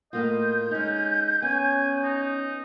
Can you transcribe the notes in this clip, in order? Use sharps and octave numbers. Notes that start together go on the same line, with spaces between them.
A2 A#3 F4 D#5 G6
G#3 C#4 D#4
B3 C#4 G#5
D#4